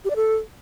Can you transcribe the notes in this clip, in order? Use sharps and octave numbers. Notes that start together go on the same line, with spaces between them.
G4
D5
A4